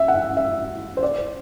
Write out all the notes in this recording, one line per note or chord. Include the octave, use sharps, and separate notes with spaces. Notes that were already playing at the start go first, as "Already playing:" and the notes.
Already playing: E5
F#5
E5
E5
C5
D5
C5